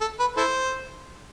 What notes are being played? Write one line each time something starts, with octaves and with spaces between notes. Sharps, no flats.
A4
B4
E4 A4 C5